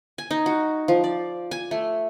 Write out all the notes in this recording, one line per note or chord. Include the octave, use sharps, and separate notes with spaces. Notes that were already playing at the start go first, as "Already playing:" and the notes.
G#5
D#4
F#4
F3
D5
G#5
A3